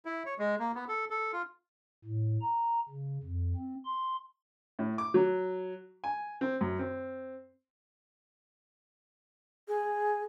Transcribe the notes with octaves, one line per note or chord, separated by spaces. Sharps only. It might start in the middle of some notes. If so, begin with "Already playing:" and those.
E4
C#5
G#3
A#3
B3
A4
A4
F4
A2
A#5
C#3
F2
C4
C6
A2
D6
F#3
G#5
C4
F#2
C4
G#4